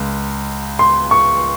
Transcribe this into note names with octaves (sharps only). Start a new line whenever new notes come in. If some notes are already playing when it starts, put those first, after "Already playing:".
Already playing: C#2 G#3
C6
C#6